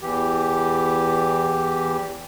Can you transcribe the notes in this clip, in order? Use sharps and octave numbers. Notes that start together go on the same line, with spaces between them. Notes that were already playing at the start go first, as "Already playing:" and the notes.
E2 E3 G4